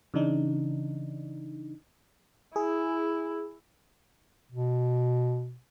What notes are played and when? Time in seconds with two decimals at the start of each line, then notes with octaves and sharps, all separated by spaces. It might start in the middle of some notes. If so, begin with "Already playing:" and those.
0.14 C#3 E3 D4 D#4
2.56 E4 G#4
4.52 B2